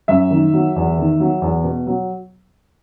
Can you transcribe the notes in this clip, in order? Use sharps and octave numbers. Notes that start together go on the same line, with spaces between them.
F#2 E5
D#3
F#3
E2
D#3
F#3
E2
B2
F#3